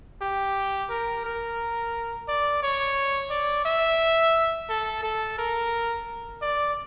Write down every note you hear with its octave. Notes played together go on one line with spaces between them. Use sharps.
G4
A#4
A#4
D5
C#5
D5
E5
A4
A4
A#4
D5